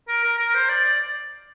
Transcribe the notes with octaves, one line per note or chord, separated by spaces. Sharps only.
A#4
A#4
A#4
C5
D5
D5